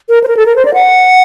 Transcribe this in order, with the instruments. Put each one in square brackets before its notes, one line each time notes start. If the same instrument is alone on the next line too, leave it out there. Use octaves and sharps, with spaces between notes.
[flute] A#4
C5
A#4
A4
A#4
C5
D5
F#5